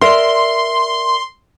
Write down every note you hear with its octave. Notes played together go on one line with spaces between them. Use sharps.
A#4 D5 E5 C6